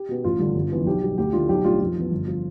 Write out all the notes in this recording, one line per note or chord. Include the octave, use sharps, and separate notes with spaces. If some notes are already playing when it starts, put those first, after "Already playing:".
Already playing: G4
B2 B3
A1 F4
G2 D3
G1
F2 E3 B3
B1 G4
B2 G3
D2 G4
D3 A3 E4 F4
B1 G4
A2 G3 D4 F4
F2 F4
E3 B3
G1
F3